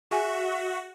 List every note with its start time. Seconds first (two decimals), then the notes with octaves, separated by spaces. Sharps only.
0.11 F#4 G#4 E5 G#5